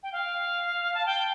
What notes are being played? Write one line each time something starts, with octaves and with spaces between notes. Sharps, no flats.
G5
F5
A5
G5